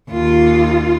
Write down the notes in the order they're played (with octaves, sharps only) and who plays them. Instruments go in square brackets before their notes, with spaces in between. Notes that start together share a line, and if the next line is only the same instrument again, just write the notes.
[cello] D#2 F4